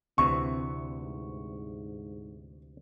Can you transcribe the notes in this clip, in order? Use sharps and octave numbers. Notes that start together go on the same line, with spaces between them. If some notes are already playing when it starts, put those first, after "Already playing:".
D2 C3 E3 C4 C#6
G#2